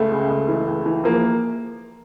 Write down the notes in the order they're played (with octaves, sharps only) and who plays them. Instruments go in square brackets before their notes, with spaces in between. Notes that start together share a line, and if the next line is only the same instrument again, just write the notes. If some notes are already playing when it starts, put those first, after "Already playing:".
Already playing: [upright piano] C#2 A3
C#3
C#2
E3
C#2
E3
F3 A#3